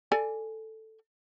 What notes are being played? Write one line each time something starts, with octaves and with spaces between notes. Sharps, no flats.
A4 D5 G#5